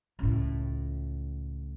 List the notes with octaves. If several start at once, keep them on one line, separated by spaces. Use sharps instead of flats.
C#2 A2